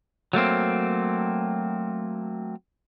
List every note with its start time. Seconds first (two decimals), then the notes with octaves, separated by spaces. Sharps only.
0.33 F#3 A3 A#3 C4